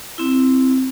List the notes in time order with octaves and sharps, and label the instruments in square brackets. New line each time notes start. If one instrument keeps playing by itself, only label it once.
[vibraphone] C4 E4